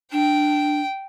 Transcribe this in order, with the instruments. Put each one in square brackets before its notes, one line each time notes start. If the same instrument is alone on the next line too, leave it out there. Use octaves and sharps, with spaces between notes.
[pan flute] D4 [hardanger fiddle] G5